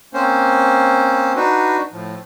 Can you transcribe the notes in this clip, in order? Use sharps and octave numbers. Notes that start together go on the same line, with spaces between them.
A#3 C4 C#4 C5
D4 D#4 F#4 B4
A2 F3